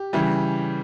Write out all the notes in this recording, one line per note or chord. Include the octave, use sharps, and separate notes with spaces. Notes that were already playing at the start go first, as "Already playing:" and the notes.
Already playing: G4
C#3 E3 G3